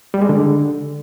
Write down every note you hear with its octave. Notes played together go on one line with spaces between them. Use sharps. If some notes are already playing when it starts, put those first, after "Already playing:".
G3
G#3
D3